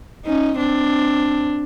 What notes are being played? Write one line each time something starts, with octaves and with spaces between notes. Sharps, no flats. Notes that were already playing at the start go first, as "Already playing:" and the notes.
C#4 D#4
C4 D4